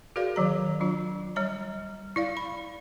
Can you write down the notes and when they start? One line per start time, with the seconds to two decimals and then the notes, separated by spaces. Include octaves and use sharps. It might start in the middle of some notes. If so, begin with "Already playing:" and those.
0.16 F#4 G#4 A#4 B4 D5 F5
0.36 D#3 F#3 A#5
0.80 F#3 D4 F4
1.36 G3 C#5 A#5
2.16 E4 D5 F5
2.37 B5